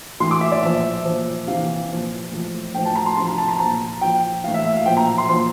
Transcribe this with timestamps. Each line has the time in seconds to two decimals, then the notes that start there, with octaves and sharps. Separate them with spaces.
0.20 A2 E3 C6
0.31 D6
0.41 E5
0.52 D5
0.62 A#2 F3 E5
1.05 A#2 F3
1.47 C3 E3 F5
1.90 A#2 F3
2.32 A2 F3
2.74 A2 G5
2.78 F3
2.85 A5
2.95 A#5
3.06 C6
3.16 C3 F3 C6
3.28 A#5
3.38 A5
3.49 A#5
3.59 A#2 F3 A#5
4.01 A#2 F3 G5
4.44 E3 F5
4.47 A2
4.54 E5
4.65 E5
4.76 F5
4.86 A#2 F3 G5
4.97 A#5
5.18 C6
5.29 A#2 F3 C6